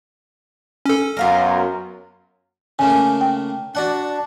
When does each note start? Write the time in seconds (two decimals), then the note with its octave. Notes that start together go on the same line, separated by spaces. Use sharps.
0.86 C#4 A4
1.17 F#2 B3 F4 A#4
2.79 C#3 A3 A#3 G#5
3.21 G5
3.75 D4 F#4 D5 F#5